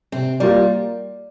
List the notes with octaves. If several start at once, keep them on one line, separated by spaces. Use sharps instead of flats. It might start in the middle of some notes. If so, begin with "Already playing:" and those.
C3 C4
G3 A#3 F4 A#4 D5